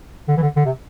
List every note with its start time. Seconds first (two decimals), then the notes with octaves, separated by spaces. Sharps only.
0.28 D3
0.37 E3
0.42 D3
0.56 D3
0.66 C3